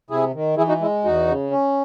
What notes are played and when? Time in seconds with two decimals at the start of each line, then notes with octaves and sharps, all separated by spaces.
0.10 C3 E4 G#4
0.34 D#3
0.57 E3 E4 G#4
0.68 D#4 F#4
0.81 G#3 E4
1.05 E2 D#4 F#4
1.28 C#3
1.51 C#4